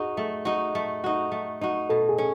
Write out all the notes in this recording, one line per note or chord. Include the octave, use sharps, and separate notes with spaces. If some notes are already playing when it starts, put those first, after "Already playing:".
Already playing: D#4 F#4 G#4
A3
D#4 F#4
A3
D#4 F#4
A3
D#4 F#4
B2 A4
G#4
C#4